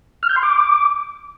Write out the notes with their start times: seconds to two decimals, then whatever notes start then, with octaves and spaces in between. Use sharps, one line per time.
0.23 F6
0.29 G6
0.36 C6
0.43 D6